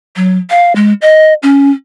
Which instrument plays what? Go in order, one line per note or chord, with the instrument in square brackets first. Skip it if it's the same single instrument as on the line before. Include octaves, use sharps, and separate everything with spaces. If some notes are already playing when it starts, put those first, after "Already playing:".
[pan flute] F#3
F5
G#3
D#5
C#4